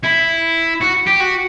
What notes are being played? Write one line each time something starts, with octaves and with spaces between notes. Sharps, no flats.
E4
F#4
G4
F#4